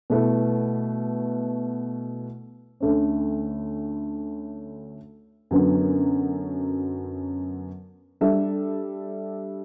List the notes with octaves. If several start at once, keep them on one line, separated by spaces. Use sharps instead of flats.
B2 A3 E4 B4
D2 D3 A3 C#4
F#2 D3 F#3 B3
G3 D4 A4 E5